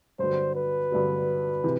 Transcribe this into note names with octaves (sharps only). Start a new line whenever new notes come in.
G2 D3 F#3 C5
B4
G2 D3 F#3
C3 E3